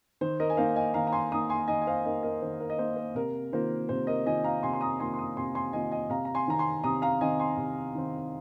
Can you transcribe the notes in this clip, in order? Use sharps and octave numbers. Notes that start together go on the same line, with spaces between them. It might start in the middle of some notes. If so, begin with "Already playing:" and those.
D#3 C5
A#4 D#5
G#5
A#3 D#4 C5 F5
D#5 G#5
D#3 F5 A#5
A#5
G#5 C6
A#3 D#4 A#5 D#6
G#5 C6
D#3 D#5 G#5
G#5
C5 F5
A#3 D#4 A#4 D#5
A#4 D#5
D#3 C5
A#4
D#5
A#3 D#4 C5
C5
C3 A#4
D#3 A#3 F4 C5
C3 C5
A#4 D#5
D#3 A#3 F4 D#5 G#5
F5 A#5
C3 G#5 C6
C6
A#5 D#6
D#3 A#3 F4 G#5 C6
C6
A#5 D#6
C3 G#5 C6
G#5 C6
D#3 A#3 F4 D#5 G#5
D#5 G#5
C3 F5 A#5
A#5
G#5 C6
D#3 C4 A#5
G#5 C6
C3 A#5 D#6
F5 A#5
D#3 C4 D#5 G#5
G#5 C6
C3
D#3 C4